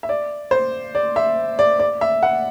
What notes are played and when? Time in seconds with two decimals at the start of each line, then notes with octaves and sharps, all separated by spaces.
0.03 E5
0.09 D5
0.51 C5
0.95 D5
1.16 E5
1.59 D5
1.79 D5
2.01 E5
2.23 F#5